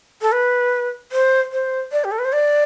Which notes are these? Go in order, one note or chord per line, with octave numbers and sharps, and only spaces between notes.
A4
B4
C5
C5
D5
G4
A4
B4
C5
D5